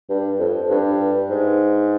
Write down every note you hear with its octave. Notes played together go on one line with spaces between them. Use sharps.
G2
F2
G2
G#2